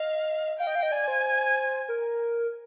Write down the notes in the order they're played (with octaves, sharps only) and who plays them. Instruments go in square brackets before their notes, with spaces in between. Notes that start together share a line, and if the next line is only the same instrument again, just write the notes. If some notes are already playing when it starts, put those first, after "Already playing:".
Already playing: [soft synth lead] D#5 [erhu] F5
[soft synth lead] F5 [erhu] G5
[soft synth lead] D#5
F5
D#5
[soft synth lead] D5 [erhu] G#5
[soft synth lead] C5
A#4